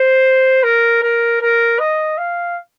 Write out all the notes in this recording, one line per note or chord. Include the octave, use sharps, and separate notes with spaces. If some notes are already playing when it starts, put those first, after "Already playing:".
Already playing: C5
A#4
A#4
A#4
D#5
F5